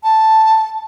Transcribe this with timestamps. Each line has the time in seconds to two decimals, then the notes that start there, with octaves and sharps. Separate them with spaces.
0.04 A5